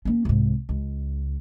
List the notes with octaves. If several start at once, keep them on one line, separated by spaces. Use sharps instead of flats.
A#3 C#4
C2 G#2
C#2